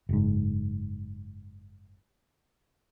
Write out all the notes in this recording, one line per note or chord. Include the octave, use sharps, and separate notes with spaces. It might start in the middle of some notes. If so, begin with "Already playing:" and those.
F#1 G#2